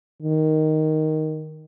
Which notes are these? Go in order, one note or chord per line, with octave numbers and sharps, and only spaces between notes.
D#3